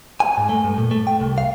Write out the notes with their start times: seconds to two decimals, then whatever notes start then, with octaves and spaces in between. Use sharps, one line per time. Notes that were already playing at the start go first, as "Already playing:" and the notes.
0.20 G#5
0.37 G#2
0.49 A3
0.64 G2
0.78 A#2
0.91 A3
1.07 G5
1.20 C2
1.38 F5